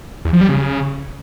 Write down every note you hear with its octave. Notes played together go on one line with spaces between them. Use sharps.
E2
F3
G3
C#3